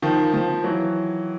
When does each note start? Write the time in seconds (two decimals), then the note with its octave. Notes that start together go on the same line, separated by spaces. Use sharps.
0.02 D#3 F3
0.34 D#3 F3
0.64 E3 F#3